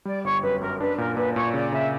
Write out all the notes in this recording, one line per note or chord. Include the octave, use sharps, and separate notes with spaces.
G3 D5
G1 C#5
F#2 B4
F#2 A#4
D4 B4
A#2 A#4
A#2 B4
A#2 C#5
C#3 D5
C#3 E5